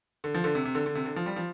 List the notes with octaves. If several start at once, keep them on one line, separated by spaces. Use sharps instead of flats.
D3
F3
D3
C3
C3
D3
D3
C3
D3
F3
G3
F3